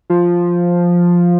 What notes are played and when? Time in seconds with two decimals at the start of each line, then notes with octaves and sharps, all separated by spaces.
0.10 F3